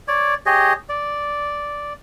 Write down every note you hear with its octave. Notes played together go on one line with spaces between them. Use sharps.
C#5 D5
G4 G#4 C#5 D#5
D5